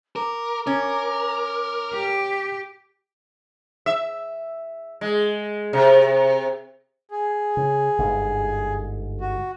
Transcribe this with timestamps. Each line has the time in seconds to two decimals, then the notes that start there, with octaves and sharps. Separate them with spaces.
0.16 A#4 D6
0.67 C#4 A#4
1.93 G4
3.86 E5
5.01 G#3
5.73 C3
7.11 G#4
7.57 C#3
7.98 G1 G#2
9.21 F#4